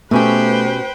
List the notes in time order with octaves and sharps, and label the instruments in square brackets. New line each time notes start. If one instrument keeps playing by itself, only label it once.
[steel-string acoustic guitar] B2 C#4 G4 [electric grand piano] A3 [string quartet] B4 C5 G5